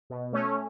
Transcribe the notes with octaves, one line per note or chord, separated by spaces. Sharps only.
B2
A3 C#4